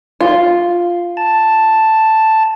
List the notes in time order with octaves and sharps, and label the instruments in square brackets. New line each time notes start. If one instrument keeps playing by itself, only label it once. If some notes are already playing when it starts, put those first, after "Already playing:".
[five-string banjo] F4
[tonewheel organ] A5